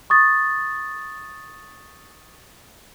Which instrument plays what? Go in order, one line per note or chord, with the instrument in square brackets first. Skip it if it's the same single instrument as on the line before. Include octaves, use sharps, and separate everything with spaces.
[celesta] C#6 D#6 A6